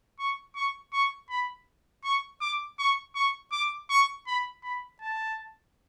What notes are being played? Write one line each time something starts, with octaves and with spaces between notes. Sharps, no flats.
C#6
C#6
C#6
B5
C#6
D6
C#6
C#6
D6
C#6
B5
B5
A5